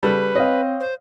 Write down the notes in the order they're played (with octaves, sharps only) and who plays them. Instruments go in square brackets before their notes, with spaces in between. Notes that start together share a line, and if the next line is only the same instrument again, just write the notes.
[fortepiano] C#3 G3 A4 [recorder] B4
[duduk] C4 [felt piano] C#5 F5 [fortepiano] D#5
[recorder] C5